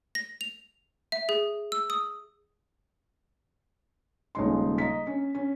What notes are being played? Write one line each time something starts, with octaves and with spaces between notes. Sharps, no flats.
A#6
F7
E5
G#4
E6
D#6
D#1 C#3 G#3 D#4 C6
D#5 A#5 B6
C#4
C#4